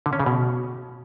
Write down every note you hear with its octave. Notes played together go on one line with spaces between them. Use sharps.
D3
C#4
C#3
B2